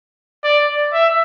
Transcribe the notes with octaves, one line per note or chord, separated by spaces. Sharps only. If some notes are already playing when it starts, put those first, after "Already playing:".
D5
E5